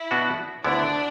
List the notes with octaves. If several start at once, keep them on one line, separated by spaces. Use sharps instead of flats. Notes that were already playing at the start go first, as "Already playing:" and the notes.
Already playing: E4
B2 B3 D4 F#4
D2 D3 B3 D4 E4